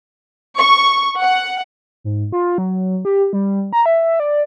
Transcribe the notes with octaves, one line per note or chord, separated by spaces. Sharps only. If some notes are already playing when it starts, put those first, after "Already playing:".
C#6
F#5
G#2
F4
F#3
G4
G3
A#5
E5
D5